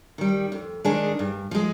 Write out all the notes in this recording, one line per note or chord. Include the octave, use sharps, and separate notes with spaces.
D#3 G3
F2
D#3 G#3 D4 G#4
G2
F3 G#3